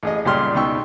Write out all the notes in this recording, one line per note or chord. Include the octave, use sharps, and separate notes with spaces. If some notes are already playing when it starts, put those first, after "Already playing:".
A1 G#4 D#5
C#2 A#2 G3 G4 C6 F6
C#2 B2 D#4 G5 C#6 E6